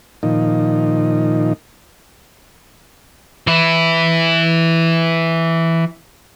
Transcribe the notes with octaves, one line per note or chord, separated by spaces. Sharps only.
A#2 D#3 F3 D#4
E3 E4